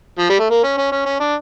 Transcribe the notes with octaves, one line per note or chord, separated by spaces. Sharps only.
F3
G3
A3
A#3
C#4
C#4
C#4
C#4
D4